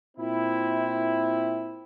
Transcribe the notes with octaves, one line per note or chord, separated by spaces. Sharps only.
A#2 C4 E4